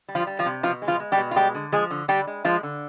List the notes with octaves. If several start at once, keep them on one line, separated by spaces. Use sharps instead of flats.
G3
F3 F4
G3
F3 F4
C3
B2 F3 F4
G#3
F3 F4
G#3
G3 G4
B2
F4
G3 G#3 G4
D3
F3 G#3 G#4
D3
D3 G3 G4
G#3
F3 G#3 F4
D3